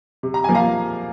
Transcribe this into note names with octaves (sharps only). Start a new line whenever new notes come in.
C3
A#5
F3 A#3 G#5
F5 A#5